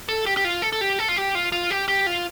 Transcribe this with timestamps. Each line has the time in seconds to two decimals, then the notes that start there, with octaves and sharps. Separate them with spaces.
0.09 A4
0.26 G4
0.37 G4
0.45 F4
0.62 A4
0.73 A4
0.81 G4
0.99 A4
1.09 F4
1.17 G4
1.35 F4
1.52 F4
1.71 G4
1.88 G4
2.06 F4